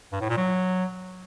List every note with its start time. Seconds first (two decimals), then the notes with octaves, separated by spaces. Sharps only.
0.12 G2
0.21 A2
0.29 A#2
0.37 F#3